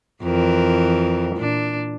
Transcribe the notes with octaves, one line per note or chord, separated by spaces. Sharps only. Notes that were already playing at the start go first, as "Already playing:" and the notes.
F2 E3 A#4
A#2 D4